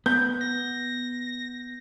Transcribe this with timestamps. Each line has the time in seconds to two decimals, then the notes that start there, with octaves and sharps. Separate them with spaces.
0.06 B3 G6
0.41 A#6